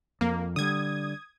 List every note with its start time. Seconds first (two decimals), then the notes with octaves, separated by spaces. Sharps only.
0.21 F2 A#3
0.56 D3 G3 D#6 G#6